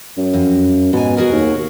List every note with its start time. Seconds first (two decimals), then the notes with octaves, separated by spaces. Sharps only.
0.17 F#2
0.33 F2
0.93 G#2 B2 G#5
1.17 F#4 G#4 A#4
1.32 D#2